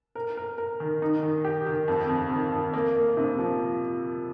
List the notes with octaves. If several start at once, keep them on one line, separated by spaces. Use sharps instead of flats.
A#4
A#4
A#4
D#3
D#4
D#3
G4
D#3
F2
F2
D#3
F2
A#3
A#3
C3
F3